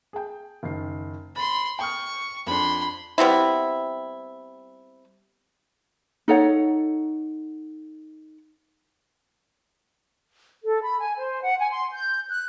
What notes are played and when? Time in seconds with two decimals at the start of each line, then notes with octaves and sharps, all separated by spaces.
0.13 G#4 G5
0.63 F#1 D#3 C7
1.36 B5 C6 A6
1.79 G5 C#6 D#6 F6
2.47 F2 D4 B5 C6
3.18 G3 B3 C4 E4
6.28 D#4 A4 C#5 F#5
10.64 A4
10.83 B5
11.00 G#5
11.18 C5
11.42 F#5
11.59 G#5
11.72 C6
11.93 G6
12.30 F#6